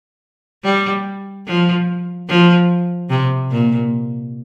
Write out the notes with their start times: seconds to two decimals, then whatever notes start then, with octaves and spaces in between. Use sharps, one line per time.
0.64 G3
1.47 F3
2.28 F3
3.10 C3
3.51 A#2